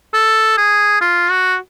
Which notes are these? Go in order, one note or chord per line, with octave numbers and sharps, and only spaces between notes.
A4
G#4
F4
F#4